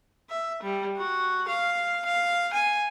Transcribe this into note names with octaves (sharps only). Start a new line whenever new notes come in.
E5
G3
F#4
F5
F5
G#5